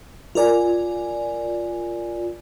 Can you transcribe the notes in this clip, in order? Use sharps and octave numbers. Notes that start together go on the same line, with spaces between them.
F4 A#4 D5 G#5